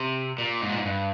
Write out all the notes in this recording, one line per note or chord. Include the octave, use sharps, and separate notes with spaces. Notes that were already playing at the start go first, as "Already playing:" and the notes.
Already playing: C3
A#2
G#2
A#2
G#2
G2